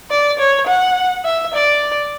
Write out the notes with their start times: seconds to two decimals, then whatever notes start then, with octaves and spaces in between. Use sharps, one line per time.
0.11 D5
0.39 C#5
0.67 F#5
1.25 E5
1.54 D5